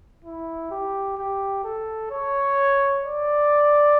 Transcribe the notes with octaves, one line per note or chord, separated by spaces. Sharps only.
E4
G4
G4
A4
C#5
D5